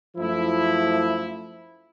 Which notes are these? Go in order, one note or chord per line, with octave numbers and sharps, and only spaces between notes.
F#2 F3 A3 E4